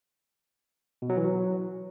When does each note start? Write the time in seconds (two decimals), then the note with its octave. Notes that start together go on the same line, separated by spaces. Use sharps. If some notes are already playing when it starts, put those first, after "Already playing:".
1.02 B2
1.10 F#3
1.17 E3
1.24 F#3